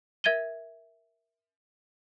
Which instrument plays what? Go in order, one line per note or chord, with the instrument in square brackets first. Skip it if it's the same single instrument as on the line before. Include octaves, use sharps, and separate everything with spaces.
[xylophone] A#4 E5 G#6 A6 D#7 G7